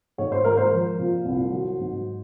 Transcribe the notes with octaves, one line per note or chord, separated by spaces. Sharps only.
G#2 C#5
C5
G#3 A#4
C5
F3
A#2
C2
F#3
G#2